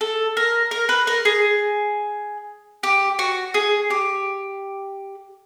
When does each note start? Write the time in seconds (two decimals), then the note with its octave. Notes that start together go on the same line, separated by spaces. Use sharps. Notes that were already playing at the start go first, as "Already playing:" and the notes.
0.01 A4
0.37 A#4
0.71 A#4
0.89 B4
1.07 A#4
1.25 G#4
2.83 G4
3.19 F#4
3.54 G#4
3.90 G4